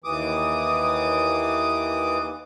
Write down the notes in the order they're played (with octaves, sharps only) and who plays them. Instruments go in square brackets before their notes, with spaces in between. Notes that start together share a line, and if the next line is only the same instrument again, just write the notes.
[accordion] D#2 E3 D6 D#6